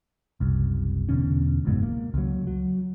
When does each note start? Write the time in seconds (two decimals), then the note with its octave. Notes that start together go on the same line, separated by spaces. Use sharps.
0.40 F#1 C2
1.09 E2 B2 D3 C#4
1.65 F#1 C#2 G#2 B2
1.83 A#3
2.14 C#2 F#3
2.47 F#3